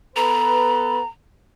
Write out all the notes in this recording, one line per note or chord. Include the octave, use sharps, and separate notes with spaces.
B3 A4 B4 A#5